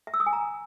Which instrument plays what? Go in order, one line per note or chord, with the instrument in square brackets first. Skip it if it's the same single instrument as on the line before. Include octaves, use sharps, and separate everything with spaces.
[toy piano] E5
E6
D#6
G#5
A#5